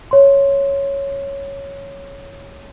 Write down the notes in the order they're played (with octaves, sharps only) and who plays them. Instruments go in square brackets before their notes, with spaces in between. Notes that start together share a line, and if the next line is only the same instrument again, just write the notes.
[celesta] C#5 C6